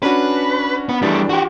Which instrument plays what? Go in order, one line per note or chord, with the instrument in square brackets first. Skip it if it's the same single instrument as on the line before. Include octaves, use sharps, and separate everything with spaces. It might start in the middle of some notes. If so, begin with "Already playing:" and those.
[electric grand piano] C#4 D4 F#4 [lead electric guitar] B4
[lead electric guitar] B3 B4
[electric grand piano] E3 D4 A6 [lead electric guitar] G3 A3
[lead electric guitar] F#4 G4